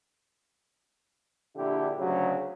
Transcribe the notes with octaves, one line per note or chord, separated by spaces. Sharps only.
A#1 D3 E4 G4
D2 C#3 F#3